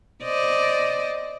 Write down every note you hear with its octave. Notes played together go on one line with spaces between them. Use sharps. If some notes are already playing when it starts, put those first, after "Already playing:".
C5 D5 D#5